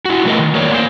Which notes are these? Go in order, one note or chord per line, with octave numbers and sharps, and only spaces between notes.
E4 F#4
F#3 A3 B3 A#4 C#5 D#5
D#3
A#3 A#4 C#5 D5
A#3 C5